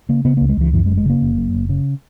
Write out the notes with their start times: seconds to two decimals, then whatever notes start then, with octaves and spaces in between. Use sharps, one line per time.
0.09 C#3 A#3
0.25 C#3 B3
0.37 C#2 A#3
0.49 G#3
0.57 C#2 E3
0.73 F#2 E3
0.86 G#3
0.90 F#1
0.97 G#3
1.05 C#3 A#3
1.22 F#1
1.37 F#2
1.54 F#1
1.69 C#3